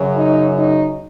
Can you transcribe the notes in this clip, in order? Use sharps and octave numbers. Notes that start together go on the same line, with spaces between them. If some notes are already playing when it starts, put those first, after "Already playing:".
Already playing: F#2 C#3 F#3
D#4
D#4